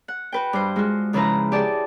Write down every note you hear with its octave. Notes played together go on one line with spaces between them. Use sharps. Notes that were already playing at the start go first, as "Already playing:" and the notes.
F#5
F#4 B4 G5
G2 C5
G#3 F4 F#4
G#2 C#3 F3 E4 B4 A#5
G4 G#4 D5 A5